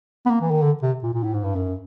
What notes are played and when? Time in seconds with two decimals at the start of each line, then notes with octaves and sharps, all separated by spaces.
0.26 B3
0.30 A#3
0.41 E3
0.51 D#3
0.62 D3
0.82 C3
1.03 A#2
1.14 A#2
1.24 A2
1.34 G#2
1.44 G2
1.55 F#2